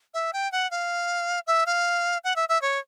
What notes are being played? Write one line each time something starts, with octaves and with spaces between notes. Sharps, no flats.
E5
G5
F#5
F5
E5
F5
F#5
E5
E5
C#5